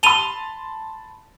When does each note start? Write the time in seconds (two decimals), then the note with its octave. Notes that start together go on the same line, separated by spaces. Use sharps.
0.03 A5 B5 C6 D#7 F7 G7